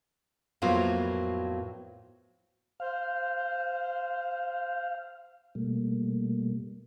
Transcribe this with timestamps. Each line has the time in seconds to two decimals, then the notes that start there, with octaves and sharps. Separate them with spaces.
0.62 F2 A2 F#3 A#3 B3 F4
2.80 C5 F5
5.55 B2 G3 A3 A#3